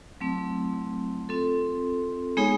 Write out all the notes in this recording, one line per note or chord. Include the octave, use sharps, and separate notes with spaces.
F#3 A3 C4 E4
C4 F4 A4
G#3 B3 D#4 G#4 C#5